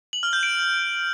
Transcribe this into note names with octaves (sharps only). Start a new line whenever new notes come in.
F#7
F6
G6
D7